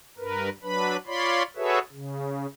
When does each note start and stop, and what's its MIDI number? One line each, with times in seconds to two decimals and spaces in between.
0.18 0.49 43
0.18 0.49 70
0.18 0.49 71
0.63 0.97 54
0.63 0.97 62
0.63 0.97 71
0.63 0.97 83
1.07 1.43 65
1.07 1.43 73
1.07 1.43 74
1.07 1.43 83
1.07 1.43 84
1.56 1.79 66
1.56 1.79 68
1.56 1.79 69
1.56 1.79 71
1.56 1.79 73
1.56 1.79 76
1.92 2.46 49